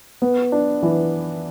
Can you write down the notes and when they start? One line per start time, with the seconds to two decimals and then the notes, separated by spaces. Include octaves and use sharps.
0.22 B3
0.52 D4
0.83 E3